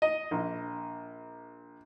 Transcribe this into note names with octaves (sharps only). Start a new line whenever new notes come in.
D#5
A#1